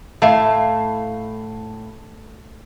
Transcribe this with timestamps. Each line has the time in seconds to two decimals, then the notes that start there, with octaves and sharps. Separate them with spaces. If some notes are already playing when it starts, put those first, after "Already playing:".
0.22 A2 A3 F5 A5